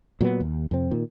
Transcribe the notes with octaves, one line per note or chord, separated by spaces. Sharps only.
A#2 F#3 A#3 B3
D#2
F2 C3 C4
A#2 D#3